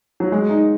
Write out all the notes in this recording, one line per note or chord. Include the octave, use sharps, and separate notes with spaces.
F#3
G#3
D#4